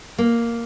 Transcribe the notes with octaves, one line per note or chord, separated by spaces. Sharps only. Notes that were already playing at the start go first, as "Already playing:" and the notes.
A#3